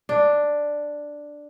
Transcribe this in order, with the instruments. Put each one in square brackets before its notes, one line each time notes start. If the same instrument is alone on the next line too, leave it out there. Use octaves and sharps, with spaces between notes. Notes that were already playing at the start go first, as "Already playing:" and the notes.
[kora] D4